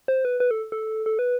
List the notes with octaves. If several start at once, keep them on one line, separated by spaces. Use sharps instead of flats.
C5
B4
B4
A4
A4
A4
B4